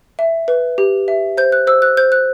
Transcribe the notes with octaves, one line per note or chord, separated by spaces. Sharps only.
E5
B4
G4
E5
C5 G6
F#6
C5 E6
F#6
C5 G6
F#6